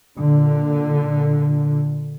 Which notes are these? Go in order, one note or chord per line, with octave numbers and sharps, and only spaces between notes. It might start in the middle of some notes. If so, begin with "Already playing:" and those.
A#2 D3